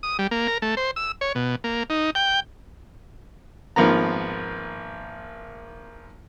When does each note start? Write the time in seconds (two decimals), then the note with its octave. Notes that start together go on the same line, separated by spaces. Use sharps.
0.03 D#6
0.19 G3
0.31 A#3
0.47 A#4
0.62 A3
0.77 C5
0.96 E6
1.21 C#5
1.35 B2
1.64 A#3
1.90 D#4
2.15 G5
3.76 G#1 F3 A#3 B3 A#5